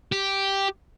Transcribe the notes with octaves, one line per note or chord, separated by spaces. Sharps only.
G4